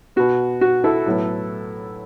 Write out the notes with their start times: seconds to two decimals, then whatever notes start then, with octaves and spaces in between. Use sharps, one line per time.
0.16 B2 B3 F#4
0.61 F#4
0.84 E4 A4
1.06 A2 F#3 B3